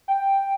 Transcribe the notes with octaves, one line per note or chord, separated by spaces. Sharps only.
G5